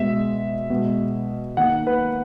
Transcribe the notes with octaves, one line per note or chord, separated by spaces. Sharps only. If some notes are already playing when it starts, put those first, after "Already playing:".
Already playing: B2 G#3 E5
B2 G#3
D#3 A#3 F#5
B4